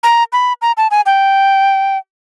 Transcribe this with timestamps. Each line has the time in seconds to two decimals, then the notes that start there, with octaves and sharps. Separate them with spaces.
0.03 A#5
0.33 B5
0.62 A#5
0.77 A5
0.91 G#5
1.06 G5